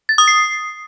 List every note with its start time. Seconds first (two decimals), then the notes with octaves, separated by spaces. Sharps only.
0.09 A6
0.18 D#6
0.28 C7